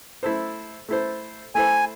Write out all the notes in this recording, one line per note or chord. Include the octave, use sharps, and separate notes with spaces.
A3 E4 A4 C5
A3 E4 A4 C5
A3 E4 A4 C5 G#5